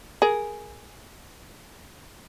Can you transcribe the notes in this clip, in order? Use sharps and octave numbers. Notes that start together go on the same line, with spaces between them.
G#4 A#4